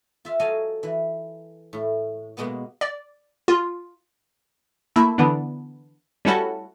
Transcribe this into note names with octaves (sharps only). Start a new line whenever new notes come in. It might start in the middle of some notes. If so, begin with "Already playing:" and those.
F4 E5
F#3 A4 D#5 F5 G#5
E3
A2
B2 G#3 A#3 B3
D5
F4
A3 A#3 E4
D3 E3 B3 D4
G3 A3 C#4 E4 F#4 A4